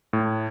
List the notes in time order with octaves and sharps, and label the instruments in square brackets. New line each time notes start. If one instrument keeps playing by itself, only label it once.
[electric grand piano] A2